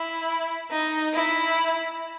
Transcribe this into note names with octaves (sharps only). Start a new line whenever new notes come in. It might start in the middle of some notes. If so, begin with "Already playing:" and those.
Already playing: E4
D#4
E4